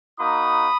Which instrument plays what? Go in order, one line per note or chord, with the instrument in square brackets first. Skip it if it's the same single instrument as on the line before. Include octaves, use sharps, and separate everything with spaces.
[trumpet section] A#3 D#4 F#4 B5 D#6